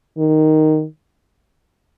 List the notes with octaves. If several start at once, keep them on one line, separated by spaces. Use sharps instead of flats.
D#3